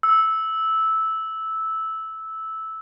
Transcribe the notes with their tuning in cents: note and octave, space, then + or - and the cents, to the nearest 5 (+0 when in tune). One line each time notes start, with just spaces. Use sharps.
E6 -10